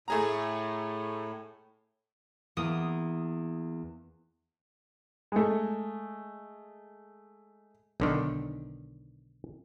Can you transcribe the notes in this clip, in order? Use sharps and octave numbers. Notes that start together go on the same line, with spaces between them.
A2 A3 G#4 A#5
E2 A#3 D#6
G#3 A3
B1 D3 D#3